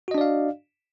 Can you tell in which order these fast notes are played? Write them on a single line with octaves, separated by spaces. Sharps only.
F#4 D#5 D4 D5 F5